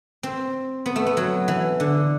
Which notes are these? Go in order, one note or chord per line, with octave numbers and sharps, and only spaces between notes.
C4
B3
A3
B3
F#3
E3
D3